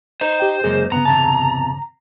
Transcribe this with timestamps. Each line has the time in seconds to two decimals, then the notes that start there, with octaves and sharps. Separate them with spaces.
0.21 D#4 C5
0.40 G4 G5
0.64 F#2 C#3 G#3 A#3 G#4
0.92 G2 C#3 B3 A#5
1.05 E2 C3 A5